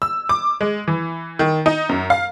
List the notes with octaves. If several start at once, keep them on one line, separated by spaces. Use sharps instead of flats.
E6
D6
G#3
E3
D#3
D#4
F#2
F5